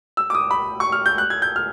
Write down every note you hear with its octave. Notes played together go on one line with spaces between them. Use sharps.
E6
D6
D#6
B5
C#6
F6
G6
F#6
G#6
G6
F6